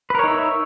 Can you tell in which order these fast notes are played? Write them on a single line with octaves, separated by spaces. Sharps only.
B4 A#4 C#5 D#4 E5